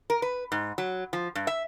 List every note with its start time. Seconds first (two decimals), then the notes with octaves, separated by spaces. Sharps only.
0.10 A#4
0.22 B4
0.52 G#2
0.78 F#3
1.13 F3
1.35 G2
1.47 E5